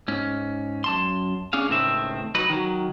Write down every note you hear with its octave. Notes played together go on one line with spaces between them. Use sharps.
G#2 C#4
F#2 A5 C6
C#4 D4 G#4 F5
C#2 A2 D#3 C4 E5
F#3 D#4 B4
D#3 F#3